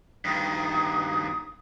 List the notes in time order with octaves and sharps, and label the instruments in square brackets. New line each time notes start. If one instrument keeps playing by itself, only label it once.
[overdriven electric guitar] G2 D#3 [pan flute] D#6